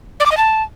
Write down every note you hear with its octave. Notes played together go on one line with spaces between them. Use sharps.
D5
D6
D#5
A5